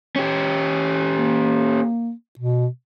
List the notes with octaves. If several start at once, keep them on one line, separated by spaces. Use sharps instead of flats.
C#4 G4
A#3
B2